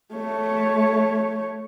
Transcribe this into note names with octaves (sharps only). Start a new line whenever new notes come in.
A3 C#5